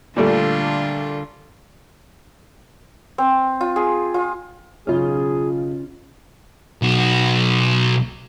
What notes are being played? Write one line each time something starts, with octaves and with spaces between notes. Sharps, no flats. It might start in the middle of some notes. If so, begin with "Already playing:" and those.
A#2 D3 G3 A3 F4
C4
F4
G#4
F4
B1 C#3 C#4 F4 G#4
B1 F#4